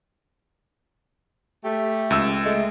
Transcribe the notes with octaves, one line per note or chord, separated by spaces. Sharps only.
A3 G4
C#2 E6
G#3 A3